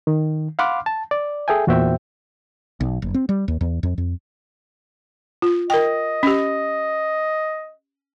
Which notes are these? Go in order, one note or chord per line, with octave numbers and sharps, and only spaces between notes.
D#3
F5 F#5 B5 C6 D6 F6
A5
D5
G#4 A4 E5 G5 G#5
E2 A#2 F#4 C5 E5 G5
B1
F#1
C4
G3
D#2
E2
F2
F2
F4
A#4 D#5 G5
C#4 G4